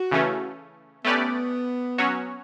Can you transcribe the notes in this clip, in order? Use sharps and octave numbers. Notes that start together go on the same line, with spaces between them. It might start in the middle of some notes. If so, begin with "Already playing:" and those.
Already playing: F#4
C#3 E3 A3 C#4
A3 B3 C#4 G4 B4 D5
F#3 C#4 F#4 C#5